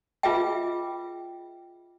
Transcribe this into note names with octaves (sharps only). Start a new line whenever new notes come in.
F4 G#4 B4 D#5 E5 G5